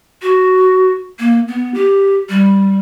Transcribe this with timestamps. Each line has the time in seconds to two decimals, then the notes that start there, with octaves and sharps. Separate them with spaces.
0.22 F#4
1.19 A#3
1.48 B3
1.74 G4
2.29 G3